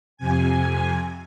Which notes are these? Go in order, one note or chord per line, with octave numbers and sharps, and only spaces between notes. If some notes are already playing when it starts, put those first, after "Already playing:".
F2 C3 G#5